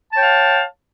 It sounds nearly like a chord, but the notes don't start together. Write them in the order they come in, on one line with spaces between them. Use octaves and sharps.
A5 C#5 G5 F5